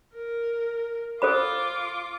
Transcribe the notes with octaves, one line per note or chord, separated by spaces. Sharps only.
A#4
F4 A4 C5 B5 D6